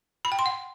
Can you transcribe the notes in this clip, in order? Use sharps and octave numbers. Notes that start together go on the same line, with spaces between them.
B5
G5
C6
F#5